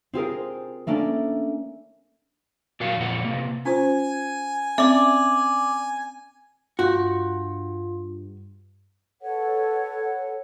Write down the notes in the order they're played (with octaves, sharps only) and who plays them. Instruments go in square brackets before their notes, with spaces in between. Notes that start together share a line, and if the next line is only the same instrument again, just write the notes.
[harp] C4 F4 G#4 A#4
A3 A#3 C#4 D4
[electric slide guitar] A#2 F#3 F#4 A#4 F5
F2 A#2 F#5
C3 A#3
[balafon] C#4 F4 C5 [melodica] G#5
[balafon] C4 C#4 [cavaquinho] D5 [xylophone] E5 D6
[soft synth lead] G2 [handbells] F4 [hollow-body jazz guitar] F#4
[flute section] A4 B4 C#5 F#5